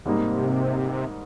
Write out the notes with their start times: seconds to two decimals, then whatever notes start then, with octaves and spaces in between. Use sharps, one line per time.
0.06 G#2 C3 G3 A#3 D#4